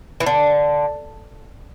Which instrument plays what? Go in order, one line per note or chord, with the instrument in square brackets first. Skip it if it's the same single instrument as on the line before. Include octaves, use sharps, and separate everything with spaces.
[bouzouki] E3
D3